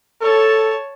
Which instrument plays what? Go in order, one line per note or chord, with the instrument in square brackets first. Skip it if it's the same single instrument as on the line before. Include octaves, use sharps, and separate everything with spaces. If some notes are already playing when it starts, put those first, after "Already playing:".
[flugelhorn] A4 [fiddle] C#5 A5